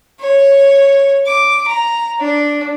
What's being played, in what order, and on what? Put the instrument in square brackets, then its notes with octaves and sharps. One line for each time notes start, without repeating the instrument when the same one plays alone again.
[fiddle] C#5
D6
A#5
D4